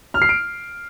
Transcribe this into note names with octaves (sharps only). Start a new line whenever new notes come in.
F6
C7
D7